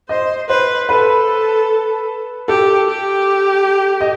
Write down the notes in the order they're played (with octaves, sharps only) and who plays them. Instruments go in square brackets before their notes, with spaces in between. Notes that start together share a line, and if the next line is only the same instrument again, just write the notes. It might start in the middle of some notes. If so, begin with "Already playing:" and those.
[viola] C5 [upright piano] D#5
[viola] B4 [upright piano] C5
[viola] A4 [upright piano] B4
[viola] G4 [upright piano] A4
[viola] G4
[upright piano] D#5